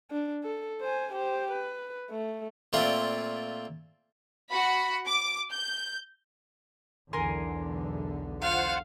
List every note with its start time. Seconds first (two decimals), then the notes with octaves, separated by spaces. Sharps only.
0.11 D4
0.44 A4
0.81 C5 G#5
1.13 G4 C5
1.52 B4
2.10 A3
2.73 A#2 A3 C4 F4 D5
4.51 F#4 F#5 B5
5.07 D6
5.51 G6
7.13 B1 E2 D3 A#4 G#5 C6
8.42 F4 C5 F5 F#5